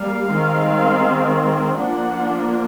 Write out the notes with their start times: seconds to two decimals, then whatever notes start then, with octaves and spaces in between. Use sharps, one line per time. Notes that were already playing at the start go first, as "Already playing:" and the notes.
Already playing: G3 A#3 F5
0.27 D#3 G#3 C4
1.76 F3 A#3 D4 F#5